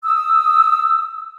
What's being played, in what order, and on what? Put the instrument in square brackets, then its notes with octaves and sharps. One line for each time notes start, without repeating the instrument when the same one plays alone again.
[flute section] D#6 E6